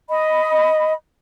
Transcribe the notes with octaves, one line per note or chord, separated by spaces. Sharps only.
D#5 B5